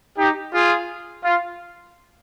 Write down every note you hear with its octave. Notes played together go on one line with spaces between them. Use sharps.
D#4 G4
F4 G#4
F4